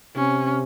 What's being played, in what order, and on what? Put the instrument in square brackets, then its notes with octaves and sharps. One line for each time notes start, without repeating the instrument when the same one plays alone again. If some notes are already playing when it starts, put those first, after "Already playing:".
[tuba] C3 [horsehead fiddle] C#4